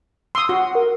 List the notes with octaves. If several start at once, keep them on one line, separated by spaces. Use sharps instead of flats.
C6 D#6 E6
F#4 F#5
A#4